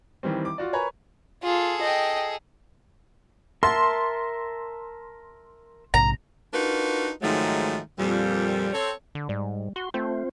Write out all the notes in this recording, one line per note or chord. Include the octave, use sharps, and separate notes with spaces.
D#3 E3 G3 C4
D6
F4 F#4 D5
A#4 B4 C#5 G#5 A#5 B5
F4 G#4 A4
D#5 G5
A#4 E5 A5 C6
A#1 G#2 C3 A#5
D4 D#4 F4 F#4 A#4 B4
G#2 D#3 F3 F#3 G#3 A3
F2 A#2 G3
C4 A4 C#5
D3
G#2 G3
F#4 C6
A3 C4 F4 C5